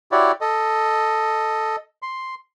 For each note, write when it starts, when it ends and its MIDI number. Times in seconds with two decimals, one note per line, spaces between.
0.12 0.32 64
0.12 0.32 66
0.12 0.32 67
0.12 0.32 73
0.12 0.32 74
0.41 1.76 69
0.41 1.76 75
2.02 2.35 84